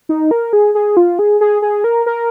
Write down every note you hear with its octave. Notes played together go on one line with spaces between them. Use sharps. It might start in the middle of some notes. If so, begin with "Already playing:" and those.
D#4
A#4
G#4
G#4
F4
G#4
G#4
G#4
A#4
A#4